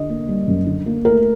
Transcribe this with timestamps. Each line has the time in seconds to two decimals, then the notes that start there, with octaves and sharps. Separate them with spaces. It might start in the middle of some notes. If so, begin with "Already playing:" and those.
Already playing: D3 D#5
0.09 A#3
0.28 G3
0.48 F#2
0.66 D3
0.86 A#3
1.05 A3 A#4